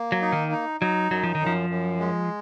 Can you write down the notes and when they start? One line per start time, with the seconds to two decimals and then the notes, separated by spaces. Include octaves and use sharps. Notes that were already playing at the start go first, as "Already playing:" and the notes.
Already playing: A#3
0.12 F#3
0.22 D#4
0.32 D#3
0.52 D#4
0.81 F#3 D#4
1.10 F#2 F#3
1.23 F3
1.35 D#3
1.40 F#2
1.46 F3
1.70 F#2
1.99 G#3